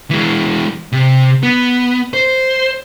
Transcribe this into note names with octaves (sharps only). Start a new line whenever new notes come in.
E3 G#3
C3
B3
C5